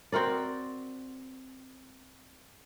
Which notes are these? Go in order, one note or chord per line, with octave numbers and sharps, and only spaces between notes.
C4 F#4 A#4 D5